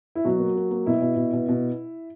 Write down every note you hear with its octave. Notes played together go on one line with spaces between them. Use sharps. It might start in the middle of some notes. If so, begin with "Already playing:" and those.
E4
B2 F#3 F#4
A#3
A#3
A#3
B2 E4
B2
B2
B2
B2